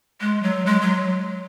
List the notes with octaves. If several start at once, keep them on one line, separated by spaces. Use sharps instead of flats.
G#3
F#3
G#3
F#3